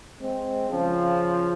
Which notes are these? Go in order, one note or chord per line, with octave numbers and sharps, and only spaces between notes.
G#3 C4
C#3 F3